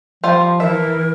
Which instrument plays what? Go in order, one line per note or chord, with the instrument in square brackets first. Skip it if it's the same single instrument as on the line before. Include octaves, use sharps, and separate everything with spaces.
[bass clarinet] F3 [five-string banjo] G3 F4 C5
[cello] E3 [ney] A#4 [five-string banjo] E5